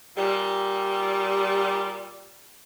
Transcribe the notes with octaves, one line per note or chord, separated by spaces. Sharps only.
A#2 G3